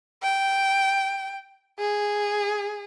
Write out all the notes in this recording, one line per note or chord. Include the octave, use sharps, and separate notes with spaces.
G5
G#4